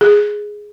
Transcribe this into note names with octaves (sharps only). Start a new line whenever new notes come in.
G#4